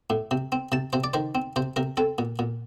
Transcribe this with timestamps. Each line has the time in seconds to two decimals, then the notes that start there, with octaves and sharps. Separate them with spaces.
0.10 A2
0.31 C3
0.52 C4
0.72 C3 A5
0.93 C3 C5
1.04 D5
1.14 D#3 C5
1.35 C4
1.56 C3 C5
1.76 C3 A#4
1.97 C4 A4
2.18 A#2
2.39 A#2